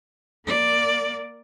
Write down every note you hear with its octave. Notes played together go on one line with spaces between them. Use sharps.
A#3 D5